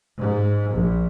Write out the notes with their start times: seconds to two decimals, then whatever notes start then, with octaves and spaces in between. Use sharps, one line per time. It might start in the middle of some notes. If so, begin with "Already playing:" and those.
0.18 G#2
0.72 A#1